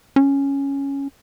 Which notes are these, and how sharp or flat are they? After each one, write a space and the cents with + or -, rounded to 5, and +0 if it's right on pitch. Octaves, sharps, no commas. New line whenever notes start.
C#4 +0